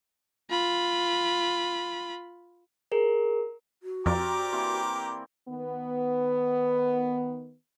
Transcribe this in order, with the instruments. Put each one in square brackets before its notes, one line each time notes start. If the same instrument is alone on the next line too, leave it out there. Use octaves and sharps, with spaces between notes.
[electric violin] F4 B5
[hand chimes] G#4 A#4
[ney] F#4
[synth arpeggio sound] F2 [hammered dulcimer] C4 A#4 D5 [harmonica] G4 A#5 D6
[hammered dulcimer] E3 A#3 C4
[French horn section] D#3 B3